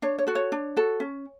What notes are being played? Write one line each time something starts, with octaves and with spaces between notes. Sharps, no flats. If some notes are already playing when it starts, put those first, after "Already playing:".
D4 C#5
C#5
F#4 A4
C#5
D4
F#4 A4
C#4